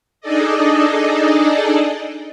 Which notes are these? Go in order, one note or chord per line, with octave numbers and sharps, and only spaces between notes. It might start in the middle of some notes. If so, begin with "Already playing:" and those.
D4 D#4 G#4 A4 D5 D#5